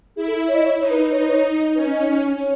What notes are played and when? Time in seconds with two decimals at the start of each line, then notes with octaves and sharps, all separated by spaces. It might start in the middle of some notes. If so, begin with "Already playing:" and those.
0.16 E4 G#4
0.27 A4
0.48 C#5
0.55 D#5
0.64 C#5
0.80 D#4 C#5
0.90 B4
1.01 B4
1.11 D#4 C#5
1.20 B4
1.29 C#5
1.75 C#4 B4
1.91 D#5
2.39 C#5